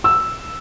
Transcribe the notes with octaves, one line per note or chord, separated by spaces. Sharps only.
E6